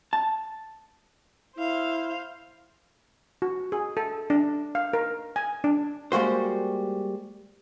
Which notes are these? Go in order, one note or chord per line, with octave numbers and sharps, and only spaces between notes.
A5
E4 C5 F5
F#4
G#4
A4
D4
F5
A#4
G#5
D4
G3 G#3 A#3 F#4 C5